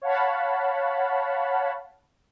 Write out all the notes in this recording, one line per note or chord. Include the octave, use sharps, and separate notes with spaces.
C#5 F5 F#5 A5 B5